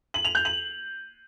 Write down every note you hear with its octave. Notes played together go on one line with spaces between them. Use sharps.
F#7
F7
G6
F#7